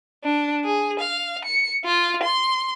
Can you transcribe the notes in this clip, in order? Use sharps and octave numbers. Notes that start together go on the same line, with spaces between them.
D4
G#4
F5
C#7
F4
C6